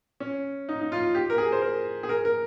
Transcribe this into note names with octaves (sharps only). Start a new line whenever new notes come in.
C#4
D#4
D#4
F4
G4
A#4
G#4
C5
A#4
G#4
A#4
A#4